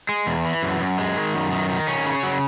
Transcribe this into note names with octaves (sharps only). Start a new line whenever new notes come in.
G#3
E2
E3
F#2
F#2
G#3
D#3
F#2
D#3
D#3
C#4
C#3
F#3